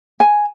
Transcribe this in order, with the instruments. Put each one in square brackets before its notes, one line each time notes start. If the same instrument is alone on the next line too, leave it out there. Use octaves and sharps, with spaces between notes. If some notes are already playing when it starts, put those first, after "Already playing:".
[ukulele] G#5